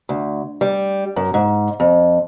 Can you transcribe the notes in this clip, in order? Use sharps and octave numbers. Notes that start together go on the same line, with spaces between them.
D2
G3
F#2
G#2
F2